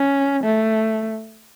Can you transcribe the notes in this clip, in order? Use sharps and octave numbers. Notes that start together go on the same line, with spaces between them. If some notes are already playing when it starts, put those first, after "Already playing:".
Already playing: C#4
A3